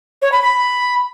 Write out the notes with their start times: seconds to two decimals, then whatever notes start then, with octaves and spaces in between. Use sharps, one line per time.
0.22 C#5
0.32 B5
0.42 B5